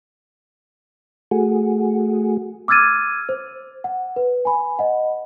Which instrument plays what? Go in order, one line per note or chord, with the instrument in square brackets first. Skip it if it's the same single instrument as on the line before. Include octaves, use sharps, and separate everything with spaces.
[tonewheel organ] A3 F#4 G#4
[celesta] D6 E6 F6 G#6 A6 D#7
C5
F#5
B4
G#5 B5
D#5 F#5